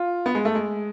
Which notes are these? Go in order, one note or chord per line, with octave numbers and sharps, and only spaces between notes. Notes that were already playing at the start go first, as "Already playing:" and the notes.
Already playing: F4
B3
G#3
A3
G#3